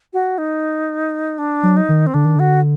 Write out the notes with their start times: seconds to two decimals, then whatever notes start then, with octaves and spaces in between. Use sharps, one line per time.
0.13 F#4
0.38 D#4
1.38 D4
1.63 F#3
1.77 D#4
1.89 D#3
2.07 C4
2.14 D3 D4
2.25 D#3
2.36 D3 F#4